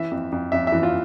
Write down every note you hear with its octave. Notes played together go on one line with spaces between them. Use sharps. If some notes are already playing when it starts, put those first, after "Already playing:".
Already playing: E3 E5
F2
F2
F2 E5
E5
E3
F4